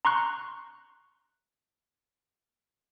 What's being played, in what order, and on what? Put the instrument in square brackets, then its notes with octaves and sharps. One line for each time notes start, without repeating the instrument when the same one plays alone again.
[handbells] A#5 C6 C#6 F#6